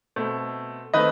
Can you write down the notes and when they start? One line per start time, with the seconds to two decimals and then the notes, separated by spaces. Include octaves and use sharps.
0.16 B2 A3 C4
0.94 D#3 A3 C4 B4 D#5